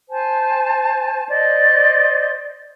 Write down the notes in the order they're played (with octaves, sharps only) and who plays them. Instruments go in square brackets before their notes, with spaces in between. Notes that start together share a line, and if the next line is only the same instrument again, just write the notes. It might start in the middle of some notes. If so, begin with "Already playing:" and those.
[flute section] C5 G#5 A5
C5 D5 D#5